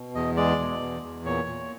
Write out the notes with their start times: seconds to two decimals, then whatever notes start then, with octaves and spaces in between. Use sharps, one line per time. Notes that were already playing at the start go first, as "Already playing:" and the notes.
Already playing: B2
0.15 E2 D#5
0.37 G#3 D5
0.59 B2
0.81 E2
1.03 E2
1.25 A#2 C#5
1.48 A#2